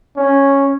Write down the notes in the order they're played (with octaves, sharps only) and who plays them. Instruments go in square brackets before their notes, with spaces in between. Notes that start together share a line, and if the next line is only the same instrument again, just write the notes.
[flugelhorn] C#4